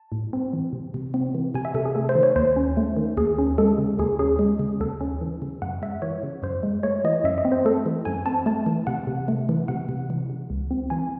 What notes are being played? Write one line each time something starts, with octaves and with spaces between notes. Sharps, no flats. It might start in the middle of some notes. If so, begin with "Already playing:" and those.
Already playing: A5
A2
C4
E3
C3
C3
C4
E3
C3 G#5
E5
C3 A4
G#4
A3 A4
C5
D#3
C#5
D#2 C5
C#4
A3
D#3
D#2 G#4
C#4
G#3 A4
C#3
D#2 G#4
C#4 G#4
G#3
C#3
D#2 A4
C#4
E3
C#3
F#2 F#5
G#3 E5
E3 C#5
C#3
F#2 C5
G#3
A3 C#5
E3 D#5
F#2 E5
D#5
C4
C5
A3 A4
E3
F#2 G#5
C4 A5
A3 A5
E3
C3 F#5
C3
A3
E3
C3 F#5
C3
E3
C#3
C#2
C4
E3 G#5